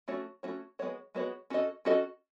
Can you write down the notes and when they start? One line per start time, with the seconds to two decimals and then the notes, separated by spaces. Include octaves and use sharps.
0.08 A3 C#4 F#4 C#5
0.43 A3 C#4 F#4 C#5
0.79 G#3 B3 F#4 C#5
1.15 G#3 B3 F#4 C#5
1.50 C#4 F#4 A4 D#5
1.85 C#4 F#4 A4 D#5